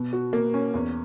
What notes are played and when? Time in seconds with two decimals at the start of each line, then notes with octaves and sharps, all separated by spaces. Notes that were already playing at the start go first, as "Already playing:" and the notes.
Already playing: B2
0.13 F#4
0.33 A#3
0.54 C#4
0.74 E2